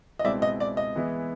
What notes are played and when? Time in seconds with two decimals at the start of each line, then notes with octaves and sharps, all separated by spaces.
0.19 D#5
0.24 C#2 B2 G#3 C4 E4 D5 E5
0.42 D#5
0.60 D5
0.77 D#5
0.96 E3 G#3 B3 E4